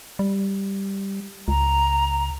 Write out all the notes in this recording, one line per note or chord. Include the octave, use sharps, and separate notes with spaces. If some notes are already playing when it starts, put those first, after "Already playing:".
G3
C#2 A#5